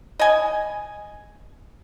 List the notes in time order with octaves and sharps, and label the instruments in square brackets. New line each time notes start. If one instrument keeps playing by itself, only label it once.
[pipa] D#5 G#5